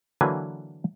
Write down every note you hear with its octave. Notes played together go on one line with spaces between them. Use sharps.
D3 E3 F#3 A#3 B4 G#5